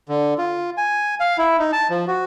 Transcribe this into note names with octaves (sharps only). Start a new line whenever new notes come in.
D3
F4
G#5
F5
E4
D#4
A5
F3
F#4